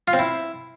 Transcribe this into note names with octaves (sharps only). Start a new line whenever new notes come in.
F4
C4
E4